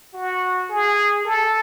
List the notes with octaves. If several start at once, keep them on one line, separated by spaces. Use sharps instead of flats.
F#4
G#4
A4